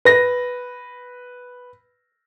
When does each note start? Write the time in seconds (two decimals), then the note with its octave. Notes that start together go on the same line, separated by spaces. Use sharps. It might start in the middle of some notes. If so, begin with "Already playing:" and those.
0.05 B4 A#6